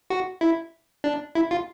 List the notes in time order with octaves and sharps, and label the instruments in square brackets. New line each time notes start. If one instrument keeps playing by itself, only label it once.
[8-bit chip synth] F#4
E4
D4
E4
F4